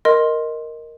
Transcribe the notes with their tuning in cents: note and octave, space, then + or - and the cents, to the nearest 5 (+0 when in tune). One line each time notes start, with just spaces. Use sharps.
A#4 +0 D#5 +0 C6 +10